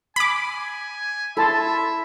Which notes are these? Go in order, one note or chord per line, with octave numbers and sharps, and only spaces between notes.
G#5 B5 D6
E4 A4 E5 A5 C6